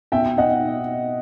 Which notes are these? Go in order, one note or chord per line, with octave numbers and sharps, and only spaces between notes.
B2 E5 G5
B2 D#5 F#5